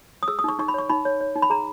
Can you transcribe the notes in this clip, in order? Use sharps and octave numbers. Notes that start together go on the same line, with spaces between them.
D#6
G#4 E6
D#6
D#4 C#6
D#4 C#6
B5
C#5 C#6
D#4 B5
C#5
C#5
D#4
B5
G#4 A#5